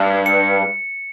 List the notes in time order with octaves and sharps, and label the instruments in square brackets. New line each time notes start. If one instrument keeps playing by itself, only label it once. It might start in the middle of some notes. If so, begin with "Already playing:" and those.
Already playing: [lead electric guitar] G2
[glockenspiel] C#7